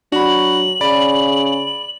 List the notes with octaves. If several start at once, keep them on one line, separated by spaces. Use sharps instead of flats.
F#3 D4 F#4 B5 F#7
C#3 D5 B5